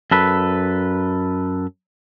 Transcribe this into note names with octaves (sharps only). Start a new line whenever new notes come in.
F#2 A4 B4